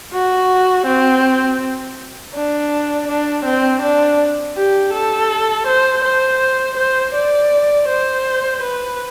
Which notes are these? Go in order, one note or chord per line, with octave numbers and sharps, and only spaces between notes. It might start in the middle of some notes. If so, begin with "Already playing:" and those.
F#4
C4
D4
D4
C4
D4
G4
A4
C5
C5
C5
D5
C5
B4